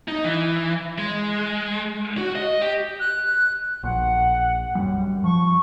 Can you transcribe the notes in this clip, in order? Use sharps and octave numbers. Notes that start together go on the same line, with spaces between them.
D#4
E3
G#3
F#4
D#5
G4
F#6
A#1 F#5
F#2 G3
F3 C#6